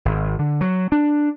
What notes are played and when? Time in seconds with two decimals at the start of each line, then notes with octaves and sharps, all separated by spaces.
0.05 G#1
0.39 D3
0.61 F#3
0.92 D4